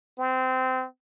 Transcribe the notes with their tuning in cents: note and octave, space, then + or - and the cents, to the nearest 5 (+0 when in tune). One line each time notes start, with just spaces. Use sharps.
C4 -20